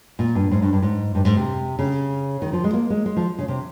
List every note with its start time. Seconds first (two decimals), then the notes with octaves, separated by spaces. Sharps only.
0.19 A#2
0.35 G2
0.51 G#2
0.62 G2
0.73 G2
0.82 G#2
1.15 G2
1.25 G#2
1.36 C3
1.79 C#3
2.42 D#3
2.53 F3
2.64 G#3
2.74 A#3
2.90 G#3
3.06 G#3
3.16 F3
3.39 C#3
3.48 C3